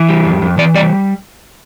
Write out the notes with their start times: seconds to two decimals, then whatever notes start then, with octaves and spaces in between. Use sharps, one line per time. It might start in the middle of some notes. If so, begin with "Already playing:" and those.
Already playing: E3
0.08 G3
0.25 F2
0.42 F2
0.58 E3 D5
0.74 G3 D5